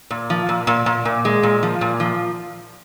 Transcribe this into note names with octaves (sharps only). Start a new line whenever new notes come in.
A#2
F3
A#2
A#2
A#2
A#2
G#3
A#2
F3
A#2
F3